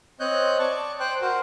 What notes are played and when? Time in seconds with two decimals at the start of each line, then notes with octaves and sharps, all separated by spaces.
0.20 C4 C#5 D#5 F#6 G6
0.59 D5 A5 C#6
1.00 C5 G5 F#6
1.21 F#4 A#4 C5